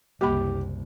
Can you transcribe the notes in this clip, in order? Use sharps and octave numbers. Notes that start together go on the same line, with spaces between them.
F#1 C2 G3 A#3 G4 B5